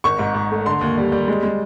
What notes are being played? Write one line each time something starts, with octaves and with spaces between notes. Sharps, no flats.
G#1 C#6
G#2
G#2
A3
D3 C6
D#2
G3
G3
G#3
G#3